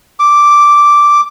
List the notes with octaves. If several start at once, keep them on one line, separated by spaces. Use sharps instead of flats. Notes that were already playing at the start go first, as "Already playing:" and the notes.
D6